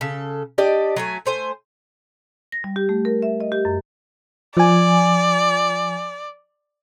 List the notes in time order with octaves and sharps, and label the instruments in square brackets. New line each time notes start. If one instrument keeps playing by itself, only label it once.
[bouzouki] C#3 A4
D4 G4 D5 D#5
F#3 A3 G#5
A3 C5 G#5
[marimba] A#6
G3
G4
A3
A#4
E5
D#5
G4
F#2
[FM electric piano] F3 G#5 [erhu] D5